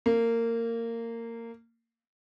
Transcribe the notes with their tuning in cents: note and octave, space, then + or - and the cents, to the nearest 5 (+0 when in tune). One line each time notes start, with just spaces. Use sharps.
A#3 -20